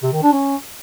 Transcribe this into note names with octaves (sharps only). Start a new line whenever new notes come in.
C3
D#3
D4
C#4